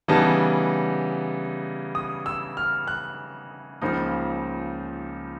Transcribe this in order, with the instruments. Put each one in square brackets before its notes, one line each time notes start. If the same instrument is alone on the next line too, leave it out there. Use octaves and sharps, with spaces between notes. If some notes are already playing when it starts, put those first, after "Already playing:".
[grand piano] C#3 E3 G3 B3 D#4 A5
D#6
E6
F6
F#6
C#2 C#3 F3 A#3 D#4